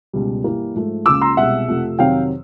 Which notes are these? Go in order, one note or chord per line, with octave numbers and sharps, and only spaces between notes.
C#2 B2 G3
G2 E3 G3 A#3
G#2 F3 A3
C#2 C#3 F3 A#3 D6 E6
A#5 C6
C2 B2 G#3 E5 F#5
F2 C3 F3 A3
F2 C3 D#3 F#3 F5 G5